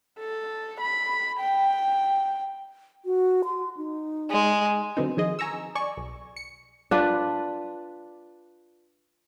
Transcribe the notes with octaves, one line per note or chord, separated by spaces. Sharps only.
A4
B5
G5
F#4
C6
D#4
G#3
D3 F#3 B3 C4 D#4
D#3 F3 G#4 D#5
G#5 A#5 C#6 E6
D5 G#5 C#6
B1
C#7
D4 F4 B4